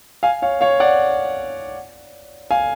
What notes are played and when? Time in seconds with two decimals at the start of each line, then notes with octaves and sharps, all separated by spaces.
0.23 F5 G#5
0.42 C#5 F5
0.61 C#5 F5
0.80 D5 F#5
2.51 F5 G#5